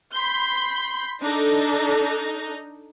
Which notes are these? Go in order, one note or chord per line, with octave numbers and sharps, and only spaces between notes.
B5 C6 G6
D4 D#4 A4